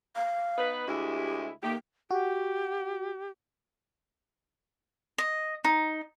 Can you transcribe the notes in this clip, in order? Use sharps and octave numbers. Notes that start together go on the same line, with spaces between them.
F5
B3 D#4 B4
D2 G#3 E4 G4
D#3 A3 A#3 G4
F#4 G4
D#5
D#4